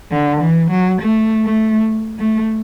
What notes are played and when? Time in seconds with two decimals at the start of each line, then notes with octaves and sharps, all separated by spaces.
0.11 D3
0.41 E3
0.70 F#3
1.01 A3
1.45 A3
2.19 A3